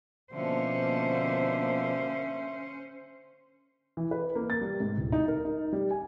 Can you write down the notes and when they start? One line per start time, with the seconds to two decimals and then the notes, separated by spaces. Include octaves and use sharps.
0.33 B2 D3 F3 A#3 C#4 C5 E5
3.97 E3
4.11 B4
4.36 A#3
4.50 A6
4.61 G3
4.80 G#2
4.98 D1
5.12 D#4
5.28 A#4
5.45 D#4
5.73 G3
5.91 G#5